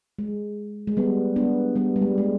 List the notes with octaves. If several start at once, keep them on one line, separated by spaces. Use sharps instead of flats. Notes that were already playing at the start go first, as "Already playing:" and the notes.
G#3
G#3
G3 B3
B3 D4
G3 B3
G3
G#3
G#3